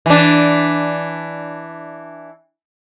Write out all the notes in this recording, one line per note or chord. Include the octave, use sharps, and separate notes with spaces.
E3 D4